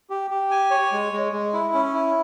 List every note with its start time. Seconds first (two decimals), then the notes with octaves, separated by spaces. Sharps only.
0.10 G4
0.30 G4
0.51 G#5
0.71 C#5
0.92 G#3
1.12 G#3
1.32 G#3
1.53 E4
1.74 C#4
1.94 E4